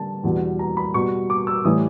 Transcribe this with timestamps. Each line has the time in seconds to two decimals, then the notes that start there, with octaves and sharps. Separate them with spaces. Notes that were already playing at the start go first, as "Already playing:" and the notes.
Already playing: D3 G3 A5
0.24 E2 B2 G3
0.59 A#5
0.77 B5
0.94 B2 G3 C#6
1.30 D6
1.47 E6
1.65 A2 E3 G3 D#6